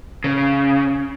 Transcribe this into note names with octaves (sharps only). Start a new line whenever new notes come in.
C#3